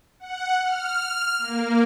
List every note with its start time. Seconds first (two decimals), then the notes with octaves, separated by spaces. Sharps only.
0.20 F#5
0.63 F6
1.39 A#3